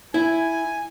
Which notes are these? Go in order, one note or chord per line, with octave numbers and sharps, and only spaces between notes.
E4 G#5